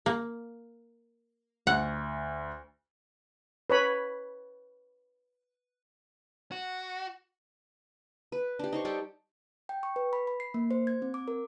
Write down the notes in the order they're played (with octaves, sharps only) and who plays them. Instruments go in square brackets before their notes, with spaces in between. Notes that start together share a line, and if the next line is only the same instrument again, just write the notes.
[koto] A#3
[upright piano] D2 [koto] F#5
[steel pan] B4 C#5 B5
[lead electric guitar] F#4
[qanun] B4
D4 G4
D#4 C5 C#6
G3 A4 G5
[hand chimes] G5
C#6
B4
B5
B5
C7
A#3
C5
G#6
C4
D6
A#4